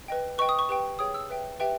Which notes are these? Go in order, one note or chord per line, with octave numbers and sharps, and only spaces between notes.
B4 D#5 G5
B4 D#5 G5 C#6
D#6
C#6
G4 B4 G5
G#4 C#5 G5 D#6
E6
B4 E5 G5
G4 B4 E5 G5